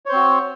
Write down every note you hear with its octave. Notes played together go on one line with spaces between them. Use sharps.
C4 F#4 C5 C#5